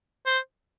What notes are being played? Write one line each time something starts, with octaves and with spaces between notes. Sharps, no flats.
C5